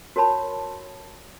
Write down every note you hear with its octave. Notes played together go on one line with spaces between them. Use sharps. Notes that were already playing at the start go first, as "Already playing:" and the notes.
F#4 A#4 C#5 A5 B5